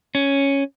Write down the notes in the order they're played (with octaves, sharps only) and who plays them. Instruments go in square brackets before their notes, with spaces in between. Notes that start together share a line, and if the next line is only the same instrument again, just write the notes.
[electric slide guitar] C#4